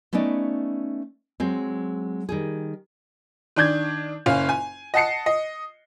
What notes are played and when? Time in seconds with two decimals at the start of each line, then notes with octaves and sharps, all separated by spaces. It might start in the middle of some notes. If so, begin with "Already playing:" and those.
0.13 A3 B3 C#4 D#4 D5
1.40 F#3 G#3 C4
2.29 D#3 G3 G#4
3.56 D#3 D4 G6 G#6
4.26 F#1 C#4 F5
4.49 G#5
4.94 D#5 F#5 A5 C7 C#7
5.26 D#5